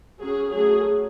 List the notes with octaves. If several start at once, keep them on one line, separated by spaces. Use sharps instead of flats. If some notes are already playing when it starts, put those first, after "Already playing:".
F#3 C#4 G#4
F#3 A3 C#4 G#4